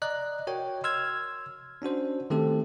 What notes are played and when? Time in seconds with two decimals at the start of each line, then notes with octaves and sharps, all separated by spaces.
0.02 D5 D#5 A#5 F#6
0.47 F#4 A#4 C#5 D#5 G5
0.84 C6 E6 F6 G#6
1.82 C#4 D4 F#4 C5
2.30 D#3 A3 C4 G4 A4